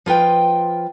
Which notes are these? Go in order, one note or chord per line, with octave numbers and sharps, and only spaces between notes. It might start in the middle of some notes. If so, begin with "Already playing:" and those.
F3 F4 B4 G5